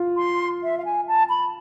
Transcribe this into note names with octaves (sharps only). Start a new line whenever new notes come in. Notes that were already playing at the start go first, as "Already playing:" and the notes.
Already playing: F4
C6
E5
F5
G#5
A5
B5